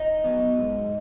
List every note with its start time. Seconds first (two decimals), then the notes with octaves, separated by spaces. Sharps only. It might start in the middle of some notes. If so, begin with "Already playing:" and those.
Already playing: D#4 D#5
0.24 F#3 B3
0.58 G#2